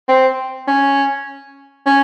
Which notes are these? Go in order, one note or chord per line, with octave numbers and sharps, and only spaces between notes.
C4
C#4
C#4